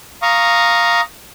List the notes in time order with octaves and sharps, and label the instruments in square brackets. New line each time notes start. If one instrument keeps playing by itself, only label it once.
[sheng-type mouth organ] F5 A#5 C#6 D#6